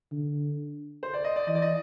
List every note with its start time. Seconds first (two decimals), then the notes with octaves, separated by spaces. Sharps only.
0.12 D3
1.03 C5
1.14 D5
1.24 D#5
1.36 D5
1.47 E3 D#5
1.55 D5
1.62 D#5